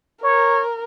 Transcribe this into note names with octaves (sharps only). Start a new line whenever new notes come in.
A#4 C#5